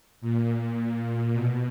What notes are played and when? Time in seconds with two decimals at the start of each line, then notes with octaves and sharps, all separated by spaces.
0.21 A#2
1.33 B2